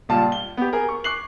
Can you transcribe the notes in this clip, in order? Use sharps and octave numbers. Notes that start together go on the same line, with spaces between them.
C#2 A#2 G3 F4 A5
G7
B3 G4
G#4 A#4
C#6
C#6 D6 F#6 C7 F#7